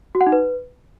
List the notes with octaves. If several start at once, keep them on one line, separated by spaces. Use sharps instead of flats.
F#4
F#5
D#4
B4